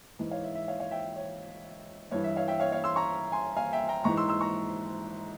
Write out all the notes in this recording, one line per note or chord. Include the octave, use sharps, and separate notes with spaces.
G#2 E3
C#5 F5
E5
E5
C#5 F5
C#5 F5
E5 G5
C#5
G2 E3 C#5
E5
C#5 F5
E5 G5
C#5 F5
C#5 F5
C6 E6
A#5 C#6
G#5 C6
F5 G#5
E5 G5
G5 A#5
G#2 E3 A#5 C#6
C6 E6
C6 E6
A#5 C#6